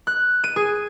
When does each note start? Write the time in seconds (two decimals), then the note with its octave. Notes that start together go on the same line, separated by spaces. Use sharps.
0.07 F#6
0.44 D#7
0.56 G#4